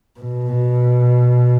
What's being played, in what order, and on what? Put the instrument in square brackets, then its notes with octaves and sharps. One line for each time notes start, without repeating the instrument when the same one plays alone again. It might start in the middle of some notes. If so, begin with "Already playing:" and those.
[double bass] B2